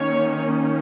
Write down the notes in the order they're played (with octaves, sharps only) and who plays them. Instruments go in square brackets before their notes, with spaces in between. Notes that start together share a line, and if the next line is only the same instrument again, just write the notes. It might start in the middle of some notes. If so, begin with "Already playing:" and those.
Already playing: [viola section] D#3 A#3 C#4 C#5